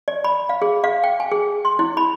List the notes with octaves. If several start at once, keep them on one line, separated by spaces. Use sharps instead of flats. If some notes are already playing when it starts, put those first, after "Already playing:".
D5
B5
F5
G#4
F5
G5
G#5
G#4
C6
E4
B5